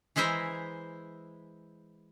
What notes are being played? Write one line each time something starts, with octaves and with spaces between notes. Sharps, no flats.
E3 G#3 E4 C5 E5 A#5